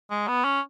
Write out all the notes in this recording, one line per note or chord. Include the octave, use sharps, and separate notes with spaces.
G#3
B3
C#4